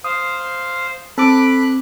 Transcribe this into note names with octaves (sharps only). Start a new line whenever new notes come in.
C5 F5 D#6
C4 A4 B5 D6 F#6